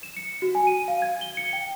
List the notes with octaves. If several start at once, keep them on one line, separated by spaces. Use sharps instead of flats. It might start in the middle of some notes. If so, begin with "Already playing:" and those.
E7
C#7
F#4
G#5
D#7
F5
G#6
G7
C#7
G5